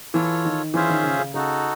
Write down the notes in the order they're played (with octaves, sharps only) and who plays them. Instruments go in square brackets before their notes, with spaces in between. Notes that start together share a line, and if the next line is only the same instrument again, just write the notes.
[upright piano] E3 [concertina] F4 A4 C#5
[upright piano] D#3
[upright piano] E3 [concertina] C#4 F4 G#4 C5 E5
[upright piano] D#3
C#3
C#3
[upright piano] C#3 [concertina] D#4 F#4 A4